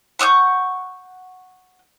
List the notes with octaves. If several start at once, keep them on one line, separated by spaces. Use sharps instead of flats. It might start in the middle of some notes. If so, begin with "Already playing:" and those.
F#5 C#6 D#6 G6